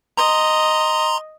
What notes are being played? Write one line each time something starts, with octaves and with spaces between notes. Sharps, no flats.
D#5 A#5 C6